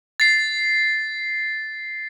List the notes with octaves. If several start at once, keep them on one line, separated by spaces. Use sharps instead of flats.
A6 C7